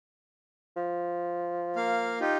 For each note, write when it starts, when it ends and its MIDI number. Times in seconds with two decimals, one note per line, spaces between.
0.76 2.30 53
1.76 2.19 58
1.76 2.19 77
2.20 2.37 63
2.20 2.37 65
2.20 2.37 67